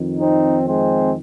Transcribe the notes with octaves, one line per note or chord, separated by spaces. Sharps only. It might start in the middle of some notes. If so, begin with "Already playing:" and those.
Already playing: F2 D#3
C4 D#4
G#3 C4